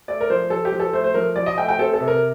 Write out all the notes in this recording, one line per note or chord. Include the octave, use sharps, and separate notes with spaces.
A3 D5
A#4
F3 C5
F3 A4
G4
F3
A4
A3 C5
C5
F3 A#4
F3 D5
D#5
A3 G5
G5
C4 A4
A4
C3
A#4